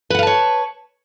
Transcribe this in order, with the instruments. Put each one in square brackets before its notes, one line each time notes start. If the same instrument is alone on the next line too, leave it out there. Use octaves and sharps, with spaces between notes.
[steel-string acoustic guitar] B4
F#5
F5
A5
C#5